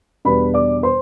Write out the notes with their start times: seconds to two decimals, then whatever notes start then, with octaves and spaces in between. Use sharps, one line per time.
0.25 E2 B2 G3 D4 B4 B5
0.54 D5 D6
0.83 C5 C6